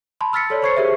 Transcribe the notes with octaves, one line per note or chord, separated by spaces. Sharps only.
A5 B5 C6
E6 F6 A6 B6 C#7
A4 C#5 D5
C5 C#5 C#6 G#6 C7 C#7
G4 G#4 A#4 C5 E5